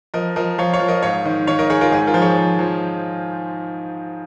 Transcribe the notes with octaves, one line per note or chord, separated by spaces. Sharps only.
F3 A#4 D#5
F3 A#4 D#5
F3 C#5 F5
C#5 F5
F3
A#4 D#5
G#2 C#5 F5
D#3
D#3 C#5 F5
A#4 D#5
D#3 G#4 C#5
F4 A#4
G#2 D#4 G#4
F4 A#4
F3
G#4 C#5
F3
F3